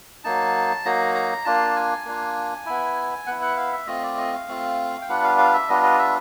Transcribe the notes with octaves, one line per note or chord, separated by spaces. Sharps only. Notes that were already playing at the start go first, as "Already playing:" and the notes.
F#3 A#3 D#4 A5
F#3 A#3 D#4 A#5
A#5
A#3 D4 F4 A5
G#5
A#3 D4 F4
B3 E4
B3 E4 F#5
F#5
F5
E5
A3 C4 F4 D#5
D5
D#5
F5
A3 C4 F4
G5
G3 B3 D4 F4 F#5
F5
F5
E5
G3 B3 D4 F4 D#5
D#5
E5